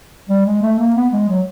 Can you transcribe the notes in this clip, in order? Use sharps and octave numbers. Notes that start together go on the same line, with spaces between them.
G3
G#3
A3
A#3
B3
G#3
F#3